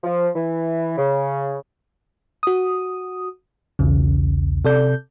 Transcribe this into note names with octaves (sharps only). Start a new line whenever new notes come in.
F3
E3
C#3
F#4 D#6
B1 E2 C#3
C3 A4 D5 G6